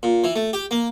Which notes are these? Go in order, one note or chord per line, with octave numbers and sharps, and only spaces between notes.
A#2
E3
A3
G4
A#3